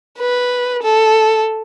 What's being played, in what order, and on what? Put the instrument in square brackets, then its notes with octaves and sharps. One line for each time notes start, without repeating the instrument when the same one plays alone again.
[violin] B4
A4